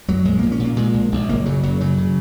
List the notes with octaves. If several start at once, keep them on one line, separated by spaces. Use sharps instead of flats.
F#2 F#3
A#1 G#3
A#2 A#3
C#4
A#2
A#3
A#2 G#3
A#1
A#1
F#1 A#3
C#3 F#3
F#1 F#3
C#3 F#3
C#3